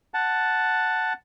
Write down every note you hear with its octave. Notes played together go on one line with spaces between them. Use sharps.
F#5 A5